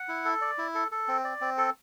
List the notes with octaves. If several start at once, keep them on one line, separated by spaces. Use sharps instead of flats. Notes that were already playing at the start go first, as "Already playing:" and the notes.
Already playing: F#5
E4
A4
D5
E4
A4
A4
C4
D5
C4
A4